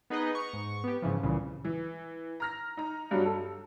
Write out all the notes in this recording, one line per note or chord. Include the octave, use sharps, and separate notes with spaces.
B3 D#4 G#4 B4 D#5
A#5 C#6
G#2 C#6
B3 G4
G#2 C#3 E3 F3
C2 A#2 C#3 E3
E3
A#5 F6 A#6
D#4 A#5
G2 F#3
A4